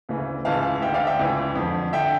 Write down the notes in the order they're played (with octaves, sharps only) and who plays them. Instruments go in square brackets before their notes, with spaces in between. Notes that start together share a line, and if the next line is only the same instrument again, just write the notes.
[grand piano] D2 C#3 E3
C#2 C#3 E3 F5 A5
D2 D3 E5 G5
D5 F5
E5 G5
C#2 C#3 E3
F2 D3
D3 E5 G5